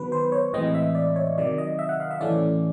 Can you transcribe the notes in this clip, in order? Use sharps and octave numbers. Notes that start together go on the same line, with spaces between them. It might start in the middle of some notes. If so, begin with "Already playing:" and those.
Already playing: D#3 F#3 B3 B4
C5
C#5
A2 E3 G#3 C4 D#5
D#5
E5
D5
C#5
C3 D#3 F#3 D5
D#5
E5
F#5
F5
E5
A2 E3 A3 C#4 D5